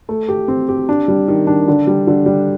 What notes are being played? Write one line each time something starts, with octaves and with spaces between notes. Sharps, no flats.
A3
G4
C4
G4
D4
G3
D#3
D4
D3
G3
D3
G3